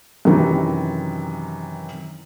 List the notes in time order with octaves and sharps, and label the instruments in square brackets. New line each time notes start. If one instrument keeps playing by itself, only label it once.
[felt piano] F#2 C3 D#3 E3